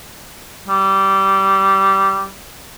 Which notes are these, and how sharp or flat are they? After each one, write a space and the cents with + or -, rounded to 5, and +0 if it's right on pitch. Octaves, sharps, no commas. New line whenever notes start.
G3 -15